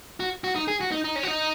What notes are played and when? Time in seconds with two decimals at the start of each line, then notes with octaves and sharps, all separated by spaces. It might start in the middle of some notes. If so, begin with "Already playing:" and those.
0.20 F#4
0.44 F#4
0.55 D#4
0.68 G#4
0.81 F#4
0.91 D#4
1.04 D#4
1.16 C#4
1.23 F#4
1.28 D#4